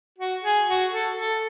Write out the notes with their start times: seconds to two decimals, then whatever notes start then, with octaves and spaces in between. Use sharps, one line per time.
0.18 F#4
0.43 G#4
0.68 F#4
0.93 A4
1.17 A4